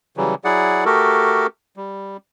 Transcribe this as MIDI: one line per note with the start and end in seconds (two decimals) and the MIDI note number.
0.17 0.35 49
0.17 0.35 52
0.17 0.35 54
0.17 0.35 55
0.44 0.84 54
0.44 0.84 64
0.44 0.84 68
0.44 0.84 74
0.44 0.84 78
0.85 1.47 57
0.85 1.47 66
0.85 1.47 67
0.85 1.47 69
0.85 1.47 70
1.77 2.17 55